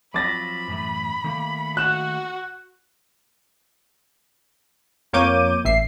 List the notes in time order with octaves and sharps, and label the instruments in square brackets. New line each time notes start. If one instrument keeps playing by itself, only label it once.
[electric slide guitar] F3 F#3 C4 [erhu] B5 [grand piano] D6 A6 A#6
[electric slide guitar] F#2 A2 E3
D#3 A3 A#3
[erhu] F#4 [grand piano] F#6 E7
[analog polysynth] F2 A#3 C#5 D6 G6 D#7
A1 E5 C7